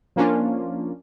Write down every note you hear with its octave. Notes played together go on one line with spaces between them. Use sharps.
F3 A#3 C#4 D4 F4